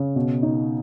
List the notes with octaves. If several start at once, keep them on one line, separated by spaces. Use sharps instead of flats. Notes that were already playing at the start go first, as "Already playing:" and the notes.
Already playing: C#3
B2
D#4